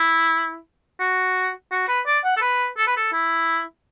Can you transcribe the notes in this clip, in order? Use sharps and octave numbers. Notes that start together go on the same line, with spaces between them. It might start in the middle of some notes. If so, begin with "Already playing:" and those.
Already playing: E4
F#4
F#4
B4
D5
F#5
A4
B4
A4
B4
A4
E4